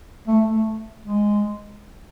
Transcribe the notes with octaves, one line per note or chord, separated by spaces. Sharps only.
A3
A3
G#3